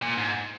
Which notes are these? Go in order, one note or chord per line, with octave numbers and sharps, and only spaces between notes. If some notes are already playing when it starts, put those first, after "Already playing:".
A#2
G#2